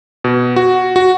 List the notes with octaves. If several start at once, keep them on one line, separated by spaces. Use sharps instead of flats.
B2
F#4
F#4